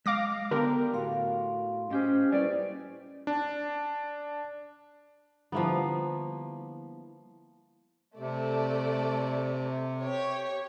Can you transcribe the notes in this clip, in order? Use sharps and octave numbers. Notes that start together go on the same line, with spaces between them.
G#3 F5 D6 A#6
D3 B3 G4 A#4 G5
A2 F#4 F5 C6
A2 C#4 G4 G#4 C5 D#5
G3 A3 A#3 C#4 E4 B4 D5
D4
D3 F3 G3 A#3 B3 E4
C3 A3 D5
G4 C#5